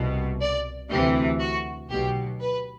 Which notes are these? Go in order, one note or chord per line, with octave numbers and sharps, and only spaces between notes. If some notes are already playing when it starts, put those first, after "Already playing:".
Already playing: C2 B2
D5
D2 C3 E3 G4
F#4
B1 B2 G4
B4